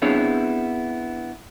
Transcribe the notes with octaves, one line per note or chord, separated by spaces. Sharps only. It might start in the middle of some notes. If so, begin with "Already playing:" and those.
B3 C4 D4 E4 G#4 C#5